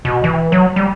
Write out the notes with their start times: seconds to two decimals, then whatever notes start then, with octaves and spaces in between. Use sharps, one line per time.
0.05 B2
0.24 E3
0.52 F#3
0.76 G3